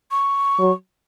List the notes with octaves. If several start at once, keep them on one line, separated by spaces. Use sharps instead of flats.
C#6
F#3